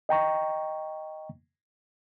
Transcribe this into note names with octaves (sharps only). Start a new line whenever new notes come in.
D#5 G5 A#5 C#6